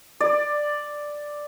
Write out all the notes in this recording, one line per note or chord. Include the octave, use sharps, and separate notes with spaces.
D5